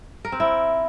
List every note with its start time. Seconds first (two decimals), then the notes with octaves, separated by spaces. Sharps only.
0.25 A#4
0.32 C4
0.40 E4